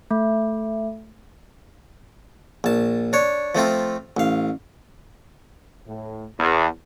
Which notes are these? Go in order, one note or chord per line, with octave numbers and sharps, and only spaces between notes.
A3
A#1 A5
D4 C#5
F3 A3 C4 F4
A1 F5
A2
E2